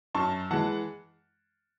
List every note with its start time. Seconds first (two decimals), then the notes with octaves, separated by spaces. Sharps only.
0.15 F#2 A5 C#6
0.51 E3 G#3 F#5 A5